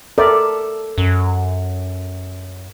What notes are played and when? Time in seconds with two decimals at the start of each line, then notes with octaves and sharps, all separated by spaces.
0.18 A4 A#4 D5 E5
0.98 F#2